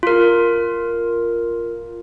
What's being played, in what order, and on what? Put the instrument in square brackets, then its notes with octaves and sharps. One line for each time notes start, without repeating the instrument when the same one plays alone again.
[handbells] F4 A#4